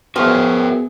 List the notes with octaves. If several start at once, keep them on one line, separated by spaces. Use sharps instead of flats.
F3 B3 F#4 G#4 A#4 E5 G5